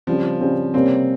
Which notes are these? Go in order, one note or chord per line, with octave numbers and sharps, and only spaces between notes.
C#3 F3 G3 C4
C#3 G3 C4
C3 G3 A#3 C4 C#4